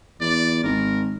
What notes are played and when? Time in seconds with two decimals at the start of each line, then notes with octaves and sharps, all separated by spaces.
0.21 E2 D5
0.64 G#1 A#4